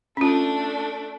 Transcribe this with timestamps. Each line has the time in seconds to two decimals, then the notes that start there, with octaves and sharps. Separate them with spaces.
0.17 A3 C#4 D4 F4